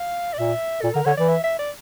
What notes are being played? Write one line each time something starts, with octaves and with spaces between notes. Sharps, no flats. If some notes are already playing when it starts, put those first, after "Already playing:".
Already playing: F5
D5
A#2 E5
A#2 A4
D3 A#4
D3 C#5
E3 D5
E5
E5
D5